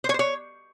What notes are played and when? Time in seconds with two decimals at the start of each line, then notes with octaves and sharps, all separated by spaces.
0.04 C5
0.09 C#5
0.14 C5
0.19 C#5